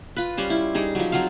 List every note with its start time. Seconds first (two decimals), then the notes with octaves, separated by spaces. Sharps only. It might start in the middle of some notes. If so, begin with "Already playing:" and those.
0.16 F4 B4
0.37 G3 C#4 C5
0.50 E4
0.75 G3 D#4 G#4
0.95 F3 F#3
1.12 F#3 C4 F4 F5